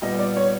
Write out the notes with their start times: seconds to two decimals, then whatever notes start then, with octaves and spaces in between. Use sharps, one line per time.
0.01 A#2 G3 B3 D#5
0.19 D5
0.36 C#5